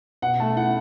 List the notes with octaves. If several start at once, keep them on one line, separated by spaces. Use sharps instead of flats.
B2 F#5
A3 A5
E4 F#5